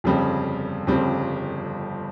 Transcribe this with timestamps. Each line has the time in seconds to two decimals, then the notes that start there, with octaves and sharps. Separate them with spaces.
0.04 G1 F2 C#3 G3 C4
0.87 G1 F2 C#3 G3 C4